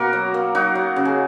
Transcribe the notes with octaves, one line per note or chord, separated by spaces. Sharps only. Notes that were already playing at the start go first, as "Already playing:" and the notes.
Already playing: B2 A#3 F#4 A#4
F#3
A#3
F#3 D#4 F#4
F#3
C#3
G#4